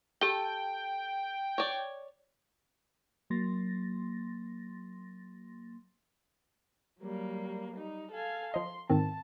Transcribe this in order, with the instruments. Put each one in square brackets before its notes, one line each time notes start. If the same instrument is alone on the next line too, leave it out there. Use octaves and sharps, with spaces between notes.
[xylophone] G4 G7 [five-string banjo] A4 [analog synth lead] G5
[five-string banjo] C#5 D5
[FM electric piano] F#3 A#3 C6 A6 A#6
[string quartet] F#3 G3 A#3
G3 D#4
A4 F5 G#5
[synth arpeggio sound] F3 D#5 [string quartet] C6
[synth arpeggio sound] G#2 D#3 C4 [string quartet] A5